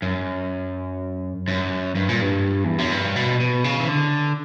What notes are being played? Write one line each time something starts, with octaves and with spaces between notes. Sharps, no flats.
F#2
F#2
G2
A#2
G2
E2
F#2
G2
B2
B2
C#3
E3
D3